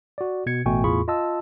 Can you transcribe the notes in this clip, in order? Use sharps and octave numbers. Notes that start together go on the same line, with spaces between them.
F#4 D5
B2 G#6 C#7
A1 B2 A3 G5 G#5 C#6
E2 A2 F4 G#4 B5 C#6
F4 D#5 A5 E6